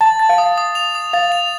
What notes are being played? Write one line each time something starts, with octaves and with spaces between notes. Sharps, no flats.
A5 A6
A6
F5
D#6
D#6
F7
D#6
F5 A6
F7